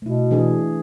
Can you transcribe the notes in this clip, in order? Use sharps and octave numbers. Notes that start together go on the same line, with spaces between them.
B2 A3 E4
E3 D4 G#4